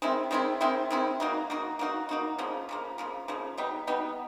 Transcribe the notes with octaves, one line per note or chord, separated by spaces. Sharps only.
D#3 G#3 C4 E4
D#3 G#3 C4 E4
D#3 G#3 C4 E4
D#3 G#3 C4 E4
A#3 D#4 F#4
A#3 D#4 F#4
A#3 D#4 F#4
A#3 D#4 F#4
C#3 F3 A#3
C#3 F3 A#3
C#3 F3 A#3
C#3 F3 A#3
B2 G3 B3 D#4
B2 G3 B3 D#4